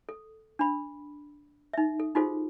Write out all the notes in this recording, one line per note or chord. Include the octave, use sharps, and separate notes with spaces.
A4
D4 B5
D#4 E5
A4
D#4 F4 F#4 G#4 A4 C5